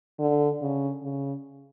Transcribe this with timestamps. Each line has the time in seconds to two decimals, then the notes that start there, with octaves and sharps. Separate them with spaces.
0.19 D3
0.61 C#3
1.03 C#3